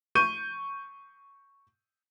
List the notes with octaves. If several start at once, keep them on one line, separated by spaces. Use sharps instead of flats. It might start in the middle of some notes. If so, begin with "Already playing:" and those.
C#6 G6 D#7